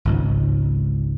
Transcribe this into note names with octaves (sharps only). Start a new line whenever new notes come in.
G#1 C#2 G#2